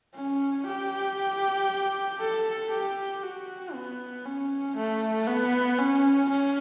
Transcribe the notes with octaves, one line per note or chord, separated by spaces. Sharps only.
C#4
G4
A4
G4
F#4
B3
C#4
A3
B3
C#4
C#4